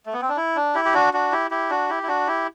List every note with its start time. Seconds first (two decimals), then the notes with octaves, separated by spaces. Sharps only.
0.06 A3
0.13 B3
0.21 C4
0.29 D4
0.37 E4
0.56 D4
0.75 E4 G4
0.85 G4
0.94 D4 F#4
1.13 D4 F#4
1.32 E4 G4
1.51 E4 G4
1.70 D4 F#4
1.89 E4 G4
2.03 E4
2.08 D4 F#4
2.27 E4 G4